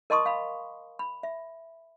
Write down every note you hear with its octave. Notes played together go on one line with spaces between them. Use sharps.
A#4 D#5 A5 C6 C#6 D#6
F5 B5
B5
E5